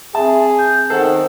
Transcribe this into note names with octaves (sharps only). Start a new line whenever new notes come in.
C4 G#4 E5 A5
G6
D#3 A4 C5 F#5